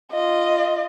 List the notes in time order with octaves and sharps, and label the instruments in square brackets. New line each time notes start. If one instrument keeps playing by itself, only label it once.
[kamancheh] F4 D#5